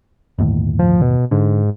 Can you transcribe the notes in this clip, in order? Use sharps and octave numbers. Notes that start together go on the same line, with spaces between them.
G1 D#2 A2
F3
B2
G#2 D3